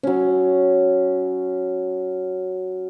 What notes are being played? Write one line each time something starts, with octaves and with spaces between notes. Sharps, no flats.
F#3 C#4